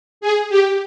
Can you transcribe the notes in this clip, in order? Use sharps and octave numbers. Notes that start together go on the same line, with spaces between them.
G#4
G4